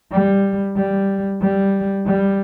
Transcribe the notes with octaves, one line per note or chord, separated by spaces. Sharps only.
G3
G3
G3
G3